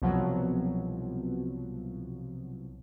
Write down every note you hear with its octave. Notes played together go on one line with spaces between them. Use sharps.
C2 B2 F3 F#3